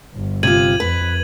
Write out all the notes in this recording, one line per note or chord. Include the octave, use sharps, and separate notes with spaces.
G1
C3 F4 G#6 D#7 F#7
F2 B4